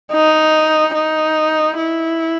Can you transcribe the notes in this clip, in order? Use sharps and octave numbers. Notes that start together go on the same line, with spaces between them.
D#4
D#4
E4